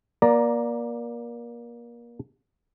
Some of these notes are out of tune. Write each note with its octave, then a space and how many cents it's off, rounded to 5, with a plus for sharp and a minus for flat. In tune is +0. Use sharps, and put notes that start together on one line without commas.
A#3 +25 D5 -5 A#5 +10